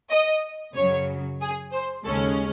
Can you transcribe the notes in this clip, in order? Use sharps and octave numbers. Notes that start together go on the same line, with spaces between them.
D#5
F#2 C#3 F#3 C#5
G#4
C5
D#2 C#3 G#3 C#4 A4